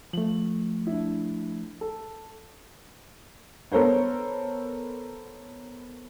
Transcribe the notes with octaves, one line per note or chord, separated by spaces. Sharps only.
F3 A3 F#7
D4 E4
A4
B3 A4 A#4 C5 C#5